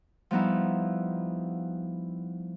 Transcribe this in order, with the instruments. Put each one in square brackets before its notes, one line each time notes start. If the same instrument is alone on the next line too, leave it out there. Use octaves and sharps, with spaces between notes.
[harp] F3 G3 B3 D#4 E4